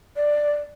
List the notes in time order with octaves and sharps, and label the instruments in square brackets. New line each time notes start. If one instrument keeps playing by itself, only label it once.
[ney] D5